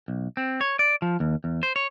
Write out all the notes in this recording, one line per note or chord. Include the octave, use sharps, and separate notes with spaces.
B1
C4
C#5
D5
F3
D#2
E2
C5
C#5